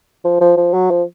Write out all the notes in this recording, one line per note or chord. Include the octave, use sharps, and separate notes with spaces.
F3
F3
F3
F#3
F3